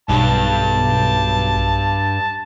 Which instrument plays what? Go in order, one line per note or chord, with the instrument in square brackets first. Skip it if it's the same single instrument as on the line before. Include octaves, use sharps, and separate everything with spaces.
[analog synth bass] B1 [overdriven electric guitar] G2 [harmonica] A5